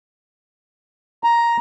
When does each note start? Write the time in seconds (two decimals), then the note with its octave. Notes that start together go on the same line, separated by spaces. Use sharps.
1.24 A#5